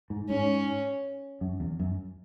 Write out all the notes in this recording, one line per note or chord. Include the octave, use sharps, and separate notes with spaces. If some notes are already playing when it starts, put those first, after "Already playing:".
G#2
G#2 C#4
F#2
E2
F#2